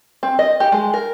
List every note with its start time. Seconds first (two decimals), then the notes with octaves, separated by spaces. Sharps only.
0.23 C4
0.39 D#5
0.60 G4
0.72 G#3
0.94 A#4